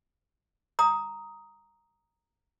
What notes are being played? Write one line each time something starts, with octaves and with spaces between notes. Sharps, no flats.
A#5 D#6